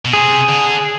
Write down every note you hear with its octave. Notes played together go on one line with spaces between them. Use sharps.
B2
C3 G#4
D3